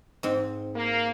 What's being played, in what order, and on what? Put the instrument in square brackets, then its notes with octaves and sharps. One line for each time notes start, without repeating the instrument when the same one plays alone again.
[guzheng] G#2 C4
[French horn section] A#3